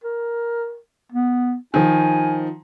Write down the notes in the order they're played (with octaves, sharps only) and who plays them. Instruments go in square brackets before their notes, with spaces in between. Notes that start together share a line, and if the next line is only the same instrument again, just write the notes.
[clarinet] A#4
B3
[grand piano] D#3 F3 [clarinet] G#5